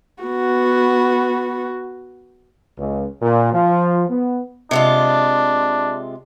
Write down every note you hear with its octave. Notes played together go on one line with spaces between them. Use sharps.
B3 F#4
C#2
A#2
F3
B3
C3 G#3 D4 F4